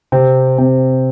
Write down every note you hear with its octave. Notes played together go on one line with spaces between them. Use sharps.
C3 C4
C3 C4